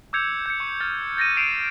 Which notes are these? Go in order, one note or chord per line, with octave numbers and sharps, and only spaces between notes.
D6 E6 G6 G#6 C#7 F7
G6 C#7
C#6
F6 A6
G6 A6 A#6 C#7 D#7
G6 A#6 C7 D7 E7 F7